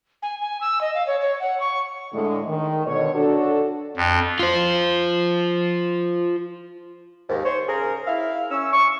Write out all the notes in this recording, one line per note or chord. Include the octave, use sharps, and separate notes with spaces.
G#5
G#5
E6
D#5
F5
C#5
C#5
F#5
C#6
A2 D3 G#3
D#3
B2 D3 C#5
D4 F#4 A4
F2
F4 C5
D#2 G#2
C5 C#5
C#3 G#4 A#4
E4 E5 F5
C#4 E6
C#6